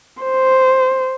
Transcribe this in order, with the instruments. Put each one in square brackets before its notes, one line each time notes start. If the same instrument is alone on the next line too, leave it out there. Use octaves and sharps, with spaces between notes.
[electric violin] C5